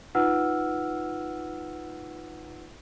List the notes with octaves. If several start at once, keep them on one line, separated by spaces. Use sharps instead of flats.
D#4 F4 B4 F#5 E6 F6